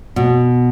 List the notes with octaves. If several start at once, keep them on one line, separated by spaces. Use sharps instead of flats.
B2